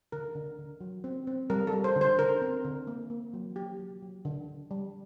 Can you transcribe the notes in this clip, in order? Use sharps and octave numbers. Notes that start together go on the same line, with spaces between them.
D3 A#4
D3
D3
F#3
C4
C4
G3 A#4
A4
G3
C5
D3
C5
D3 A#4
C4
D3
A#3
A#3
F#3
F#3 G4
F#3
F#3
D3
D3
G3